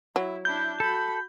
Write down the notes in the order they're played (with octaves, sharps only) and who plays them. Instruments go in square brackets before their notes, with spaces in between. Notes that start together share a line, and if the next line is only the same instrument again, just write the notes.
[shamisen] F#3 [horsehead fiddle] E4
[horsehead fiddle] D4 E4 [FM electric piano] G6
[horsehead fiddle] F#4 B5 [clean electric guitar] A4